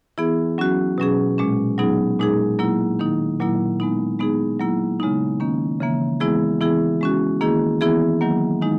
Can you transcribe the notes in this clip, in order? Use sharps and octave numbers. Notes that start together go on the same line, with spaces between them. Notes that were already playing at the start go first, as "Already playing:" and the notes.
E3 B3 E4 G#4
F#3 C#4 F#4
B2 F#3 C#4 G#4
A#2 G#3 C#4
F#3 B3 D#4 G#4
A#2 G#3 D#4 G#4
F#3 A#3 E4
D#3 A#3 D#4
A#2 F#3 A#3 E4
G#3 B3 D#4
G#3 B3 D#4 G#4
F#3 A#3 E4
C#3 G#3 B3 D#4
D#3 A#3 C#4
C#3 E3 A#3
E3 G#3 B3 E4 G#4
E3 B3 E4 G#4
G#3 C#4 F#4
D#3 A#3 E4 G#4
E3 B3 E4 G#4
D#3 F#3 A#3
D#3 G#3 D#4